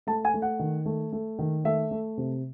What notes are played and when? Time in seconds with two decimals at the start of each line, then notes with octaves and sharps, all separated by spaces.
0.07 A3 A5
0.25 G#5
0.34 A3
0.42 F#5
0.59 D#3
0.86 A3
1.12 A3
1.39 D#3
1.64 A3 E5
1.91 A3
2.17 C3